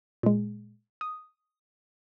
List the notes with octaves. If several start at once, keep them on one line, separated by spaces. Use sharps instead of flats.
A#2 G#3
D#6